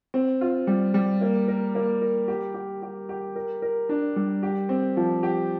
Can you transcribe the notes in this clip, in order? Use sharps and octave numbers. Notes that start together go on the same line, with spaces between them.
C4
F4
G3
G3
A#3
A#4
A#3
A#4
G4
G4
G4
G4
A#4
A#4
D4
G3
G4
C4
F3
G4